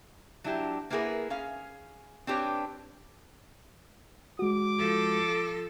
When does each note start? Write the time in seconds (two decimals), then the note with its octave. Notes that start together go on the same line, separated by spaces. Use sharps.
0.44 F#3 D4 E4 F#4 G4
0.90 A#3 B3 E4 G4 G#4 A#4
1.30 C#4 G#4 F5
2.27 C4 D4 G4 B4 C#5
4.39 G#3 F#4 D6
4.78 F3 A4